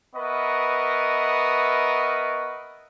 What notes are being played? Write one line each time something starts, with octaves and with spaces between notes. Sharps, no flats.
B3 A#4 B4 D#5 E5 C#6